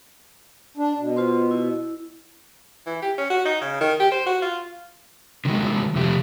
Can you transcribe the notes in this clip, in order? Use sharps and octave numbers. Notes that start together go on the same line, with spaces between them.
D4
B2
F4 C5 C6
E4
E3
G4
C#4
F#4
D#4
C#3
D#3
G4
C5
F#4
F4
D3 D#3 F#3 G#3
C3 F3 A3 G4